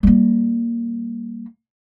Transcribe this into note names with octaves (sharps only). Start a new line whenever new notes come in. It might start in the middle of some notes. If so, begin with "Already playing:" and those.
G3 A#3